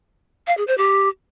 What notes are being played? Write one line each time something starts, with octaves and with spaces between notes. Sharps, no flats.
F5
G#4
C5
G4